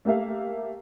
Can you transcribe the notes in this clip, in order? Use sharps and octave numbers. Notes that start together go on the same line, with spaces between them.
A3 A#3 G4 E5 F5